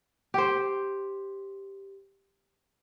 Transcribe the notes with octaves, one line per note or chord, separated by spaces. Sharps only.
G4 C5